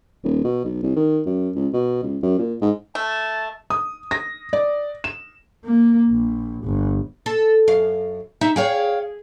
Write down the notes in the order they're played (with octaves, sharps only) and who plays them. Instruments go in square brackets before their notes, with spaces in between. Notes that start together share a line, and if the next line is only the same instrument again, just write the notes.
[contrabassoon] D#1
B2
B1
C2
D#3
F#2
C#2
B2
C#2
F#2
A#2
G#2
[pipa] A3 [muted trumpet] A5
[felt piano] D#6
A#6
D5
E7
[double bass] A#3
A#1
G1
[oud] A4
F#2 F5
[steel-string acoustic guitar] D#4 [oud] E5
[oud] G#4 [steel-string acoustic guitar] C#5 F5 G5